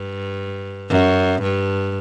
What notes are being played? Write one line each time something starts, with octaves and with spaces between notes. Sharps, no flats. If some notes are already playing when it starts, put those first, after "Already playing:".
Already playing: G2
F#2
G2